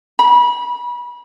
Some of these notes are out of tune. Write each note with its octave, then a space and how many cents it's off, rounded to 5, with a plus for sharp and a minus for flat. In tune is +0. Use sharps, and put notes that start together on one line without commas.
B5 -30